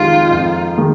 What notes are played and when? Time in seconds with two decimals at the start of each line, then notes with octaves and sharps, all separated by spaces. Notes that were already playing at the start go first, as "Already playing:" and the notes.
Already playing: F2 D#3 G#3 D#4 F4 G4
0.31 F2
0.77 D#3 G#3